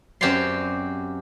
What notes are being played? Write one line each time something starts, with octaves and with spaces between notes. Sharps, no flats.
F#2 C4 G4 C#5 D5 C6